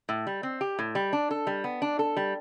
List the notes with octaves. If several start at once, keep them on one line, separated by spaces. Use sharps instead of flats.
A2
G3
C4
G4
A2
G3
D4
A4
G3
B3
D4
A4
G3